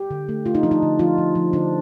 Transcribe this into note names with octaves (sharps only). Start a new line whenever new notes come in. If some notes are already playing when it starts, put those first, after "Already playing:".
Already playing: G4
D3
A3
A3 F4
D#4
F3 D4
D#4
D3
F3 F4
F3
F3
D3 D4